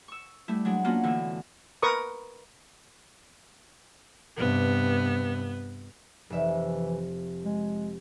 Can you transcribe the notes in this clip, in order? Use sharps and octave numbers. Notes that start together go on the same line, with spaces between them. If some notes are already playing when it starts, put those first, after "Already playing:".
C#6 E6
G3 A3 E4
F#3 G#3 D4
A#3 B3 C#4 D4 F4 F#4
A2 D3 E3
A#4 B4 C#6 D#6
G2 C3 B3
F1 E3 E5
G#3